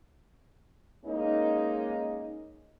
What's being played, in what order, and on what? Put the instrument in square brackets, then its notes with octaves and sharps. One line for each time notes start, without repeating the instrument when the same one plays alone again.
[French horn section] G#3 A#3 C#4 D#4